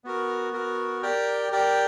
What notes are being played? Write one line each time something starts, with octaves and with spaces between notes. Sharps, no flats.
B3 F#4 A#4
B3 F#4 A#4
G4 A#4 D5 G5
G4 A#4 D5 G5